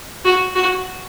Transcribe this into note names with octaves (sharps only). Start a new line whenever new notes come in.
F#4
F#4